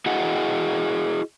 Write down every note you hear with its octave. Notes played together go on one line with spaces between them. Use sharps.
E4 F#4 G#4 D#5 F#5